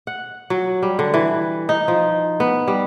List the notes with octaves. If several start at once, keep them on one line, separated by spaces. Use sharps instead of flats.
F#5
F#3
G3
D3
E3
D#4
F3
B3
G3